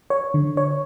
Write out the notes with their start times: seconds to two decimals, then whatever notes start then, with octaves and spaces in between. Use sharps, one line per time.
0.10 C#5
0.34 D3
0.57 C#5